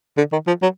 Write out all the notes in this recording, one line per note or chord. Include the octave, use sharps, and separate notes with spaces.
D3
D#3
F3
F#3